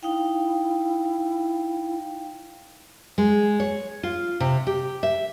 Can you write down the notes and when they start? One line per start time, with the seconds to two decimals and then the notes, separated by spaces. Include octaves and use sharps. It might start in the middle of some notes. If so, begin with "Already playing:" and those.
0.03 D#4 E4 F5 G5
3.18 G#3
3.60 C#5
4.03 F4
4.40 C3
4.67 G4
5.03 E5